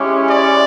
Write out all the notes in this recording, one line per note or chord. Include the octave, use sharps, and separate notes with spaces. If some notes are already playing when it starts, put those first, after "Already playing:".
Already playing: G#3 C#4 E4 G4
D5